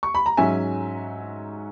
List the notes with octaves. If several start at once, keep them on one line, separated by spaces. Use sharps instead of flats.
C#6
B5
A#5
G#2 F#3 C#4 E5 G#5